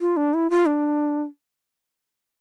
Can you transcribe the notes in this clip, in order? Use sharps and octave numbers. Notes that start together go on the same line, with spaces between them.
F4
D4
E4
F4
D4